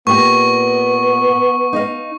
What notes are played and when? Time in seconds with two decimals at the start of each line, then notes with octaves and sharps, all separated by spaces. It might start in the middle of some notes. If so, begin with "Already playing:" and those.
0.07 A#2 B3 G4 C#6
1.73 D#4 D#5 F5